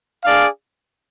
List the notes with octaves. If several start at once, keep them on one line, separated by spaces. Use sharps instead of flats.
D4 G#4 D5 F5